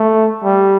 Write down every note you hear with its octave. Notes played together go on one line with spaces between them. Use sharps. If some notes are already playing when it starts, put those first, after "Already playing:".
Already playing: A3
G3